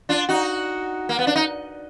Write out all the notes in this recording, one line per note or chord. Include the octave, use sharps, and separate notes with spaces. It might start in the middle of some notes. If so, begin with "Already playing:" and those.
D4 F4
D#4 F#4
A#3
B3
D4
D#4